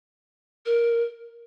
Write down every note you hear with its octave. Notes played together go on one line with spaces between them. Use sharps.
A#4